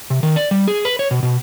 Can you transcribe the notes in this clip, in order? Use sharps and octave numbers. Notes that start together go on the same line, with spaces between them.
C3
D#3
D5
G3
G#4
B4
C#5
B2
B2